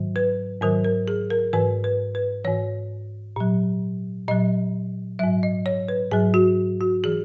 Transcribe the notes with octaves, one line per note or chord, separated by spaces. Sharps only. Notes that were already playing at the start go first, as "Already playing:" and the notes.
Already playing: G#2 D#3 F#3
B4
G#2 D#3 F#3 A#4
A#4
G#4
A#4
G#2 E3 B4
B4
B4
G#2 E3 C#5
A#2 F#3
A#2 F#3 D#5
G#2 F#3 E5
D#5
C#5
B4
G#2 F#3 G#4
F#4
F#4
E3 G#4